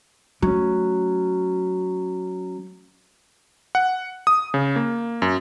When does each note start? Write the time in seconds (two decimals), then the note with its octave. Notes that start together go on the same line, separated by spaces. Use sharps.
0.42 F#3 A3 C#4
3.75 F#5
4.27 D#6
4.54 C#3
4.76 A#3
5.22 F#2